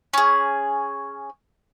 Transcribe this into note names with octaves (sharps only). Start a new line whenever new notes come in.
C#4 G#4